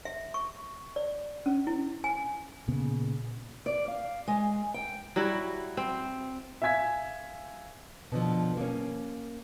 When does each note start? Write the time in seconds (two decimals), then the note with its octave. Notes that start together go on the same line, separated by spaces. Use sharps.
0.05 E5
0.34 C#6
0.96 D5
1.46 C#4
1.67 E4
2.04 G#5
2.68 A#2 C#3 B3
3.66 D5
3.88 F5
4.28 G#3
4.74 G5
5.16 F#3 G3 E4 F#4
5.77 C4
6.62 E5 F5 G#5 G#6 B6
8.12 B2 D3 F3
8.57 A#3 C#4